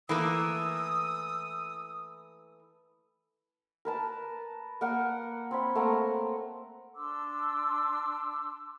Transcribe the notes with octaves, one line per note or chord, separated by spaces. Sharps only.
E3 A3 A#3 D#6 E6
A#4 B4 A5
A#3 A#4 F#5
C4 C#5 B5
A3 A#3 F#5 A#5
D4 C6 D6 E6